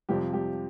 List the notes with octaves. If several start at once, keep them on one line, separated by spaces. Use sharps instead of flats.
F2 C3 F3 G3 G4
G3 G4